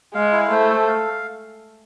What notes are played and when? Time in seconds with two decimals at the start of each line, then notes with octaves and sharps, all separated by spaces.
0.14 G#3 F5
0.32 E4
0.51 A3 C5
0.70 A4
0.87 F5